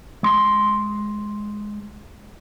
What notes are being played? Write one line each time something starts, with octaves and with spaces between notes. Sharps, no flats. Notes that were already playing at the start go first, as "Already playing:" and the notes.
G#3 C6